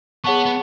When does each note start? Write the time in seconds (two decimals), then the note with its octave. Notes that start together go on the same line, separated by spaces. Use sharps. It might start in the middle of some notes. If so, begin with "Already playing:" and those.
0.24 B3 G#4 C#5 F#5 A5 C#6
0.45 B3